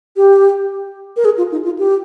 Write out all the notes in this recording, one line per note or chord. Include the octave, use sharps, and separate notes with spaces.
G4
A#4
G#4
F4
D#4
F4
G4